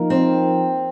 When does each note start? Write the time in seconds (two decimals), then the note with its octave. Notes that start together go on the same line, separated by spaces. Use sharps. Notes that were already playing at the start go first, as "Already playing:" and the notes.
Already playing: F3 A#3 D#4 A#4
0.10 C4